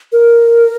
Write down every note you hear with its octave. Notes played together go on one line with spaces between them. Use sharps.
A#4